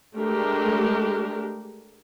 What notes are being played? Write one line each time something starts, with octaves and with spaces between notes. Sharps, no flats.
G#3 A3 D4 G4 A#4